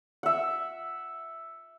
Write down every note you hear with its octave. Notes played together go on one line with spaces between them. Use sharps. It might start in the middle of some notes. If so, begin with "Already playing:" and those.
E5 F#5